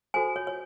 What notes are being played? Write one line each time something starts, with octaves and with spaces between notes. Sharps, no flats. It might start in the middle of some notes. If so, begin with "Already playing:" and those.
F#4 A4 C5 G#5
C#5
C#5